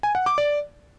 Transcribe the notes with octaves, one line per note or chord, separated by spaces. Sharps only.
G#5
F#5
D6
D5